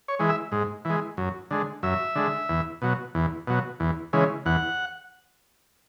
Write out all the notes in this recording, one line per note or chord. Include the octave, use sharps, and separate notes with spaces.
C#5
E3 G#3
E5
G#2
E3 G#3
F#2
D3 G#3
F#2 E5
D3 G#3
E2
B2 F#3
E2
B2 F#3
E2
C#3 E3 G#3
E2 F#5